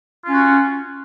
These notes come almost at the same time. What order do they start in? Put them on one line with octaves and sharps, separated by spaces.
F4 C#4 F#4